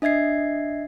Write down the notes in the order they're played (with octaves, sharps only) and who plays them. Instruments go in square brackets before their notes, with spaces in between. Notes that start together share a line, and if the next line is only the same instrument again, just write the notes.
[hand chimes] D4 D#5 E5 G#6 C7